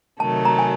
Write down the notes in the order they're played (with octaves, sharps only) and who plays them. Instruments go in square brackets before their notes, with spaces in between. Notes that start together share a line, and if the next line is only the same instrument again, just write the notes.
[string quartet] C3 D#3 F#3 A3 [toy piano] A5
[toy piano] A#5
G#5